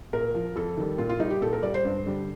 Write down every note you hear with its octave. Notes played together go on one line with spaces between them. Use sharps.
A#2 A#4
F3
F2 A4
D#3 G3
A#2 F4
F4
G3 D#4
G4
A#2 A4
A#4
G3 D5
C5
G2
D3 G3